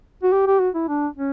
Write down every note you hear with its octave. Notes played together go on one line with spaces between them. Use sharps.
F#4
G4
G4
F#4
E4
D4
C#4